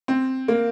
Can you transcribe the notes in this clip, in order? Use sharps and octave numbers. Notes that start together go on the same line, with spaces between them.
C4
A#3